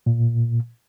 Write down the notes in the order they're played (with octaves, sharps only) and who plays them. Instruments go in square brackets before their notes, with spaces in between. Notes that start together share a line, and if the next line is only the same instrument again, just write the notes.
[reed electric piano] A#2